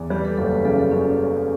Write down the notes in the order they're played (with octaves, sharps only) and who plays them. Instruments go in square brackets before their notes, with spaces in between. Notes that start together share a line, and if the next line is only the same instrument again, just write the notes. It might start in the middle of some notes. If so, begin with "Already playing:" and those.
Already playing: [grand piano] E2
[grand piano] G3 [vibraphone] G4
[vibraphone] B4
A4
[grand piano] F#1 [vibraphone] A4
[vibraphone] B4
[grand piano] C#3 [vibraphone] A4
[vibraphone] A4
[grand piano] F#2 [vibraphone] C#4